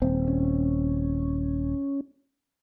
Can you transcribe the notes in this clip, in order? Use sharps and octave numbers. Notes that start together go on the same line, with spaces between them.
D#1 C4
C#4